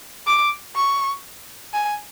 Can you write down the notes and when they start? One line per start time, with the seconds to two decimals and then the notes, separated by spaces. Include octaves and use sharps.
0.27 D6
0.76 C#6
1.73 G#5